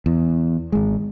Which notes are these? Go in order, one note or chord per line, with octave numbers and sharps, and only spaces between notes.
E2
G#1 G#3